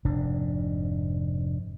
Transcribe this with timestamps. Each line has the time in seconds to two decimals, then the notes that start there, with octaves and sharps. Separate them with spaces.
0.05 F1 G#2 C3 D4